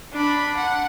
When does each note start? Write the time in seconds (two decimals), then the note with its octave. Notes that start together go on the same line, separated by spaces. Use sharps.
0.13 D4 B5
0.57 F#5